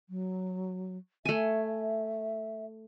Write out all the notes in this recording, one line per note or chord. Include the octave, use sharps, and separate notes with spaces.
F#3
A3 E5 G#5